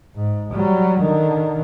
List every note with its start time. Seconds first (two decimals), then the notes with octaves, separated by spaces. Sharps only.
0.16 G#2
0.53 F#3 G3
1.01 D3 D#3